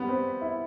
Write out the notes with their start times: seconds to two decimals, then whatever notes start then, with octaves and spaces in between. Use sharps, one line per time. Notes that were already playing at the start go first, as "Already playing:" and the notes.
Already playing: G3 B3
0.08 C4
0.41 E4